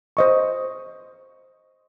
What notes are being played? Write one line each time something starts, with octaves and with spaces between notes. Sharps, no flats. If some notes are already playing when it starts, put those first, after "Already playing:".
C5 D#5 C#6